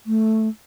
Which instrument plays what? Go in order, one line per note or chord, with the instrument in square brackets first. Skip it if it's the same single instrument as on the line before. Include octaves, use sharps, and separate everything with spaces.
[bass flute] A3